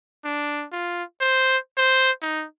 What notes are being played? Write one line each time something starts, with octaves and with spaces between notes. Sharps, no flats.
D4
F4
C5
C5
D#4